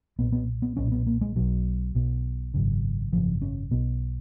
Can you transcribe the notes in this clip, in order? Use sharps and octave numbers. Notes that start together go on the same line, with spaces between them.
B1 A#2 B3
B3
B3
B1 A#2 C#4
B3
A#3
G#3
B1 B2 F#3
B1 B2
G#1 F#2 C#3
G#1 F#2 C#3 F3
C#4
B1 B2 B3